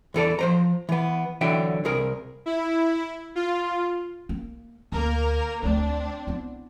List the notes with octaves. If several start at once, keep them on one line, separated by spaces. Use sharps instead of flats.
E2 E3 A4 D5
F3 C5 A#5
E3 B3
D3 E3 F#3 E5 G5
C2 G#4 A#4
E4
F4
A#3
D2 A#3 A#4
D2 A3 C4 D4
B3 E4